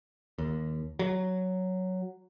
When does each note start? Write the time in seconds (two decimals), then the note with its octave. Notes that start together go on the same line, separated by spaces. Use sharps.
0.38 D#2
0.99 F#3